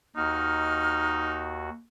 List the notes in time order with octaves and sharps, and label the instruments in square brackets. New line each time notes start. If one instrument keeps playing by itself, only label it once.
[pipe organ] D#2 F#4 [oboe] D#4 [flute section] F6